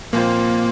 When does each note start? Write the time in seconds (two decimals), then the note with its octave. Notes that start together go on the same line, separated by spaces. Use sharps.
0.13 A#2 F3 A#3 C4 F4 C5